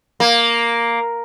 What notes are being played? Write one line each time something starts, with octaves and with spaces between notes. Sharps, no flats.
A#3